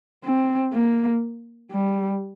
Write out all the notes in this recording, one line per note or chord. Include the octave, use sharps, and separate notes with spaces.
C4
A#3
G3